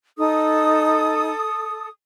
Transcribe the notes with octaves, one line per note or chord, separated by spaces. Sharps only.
D#4 A4 D#6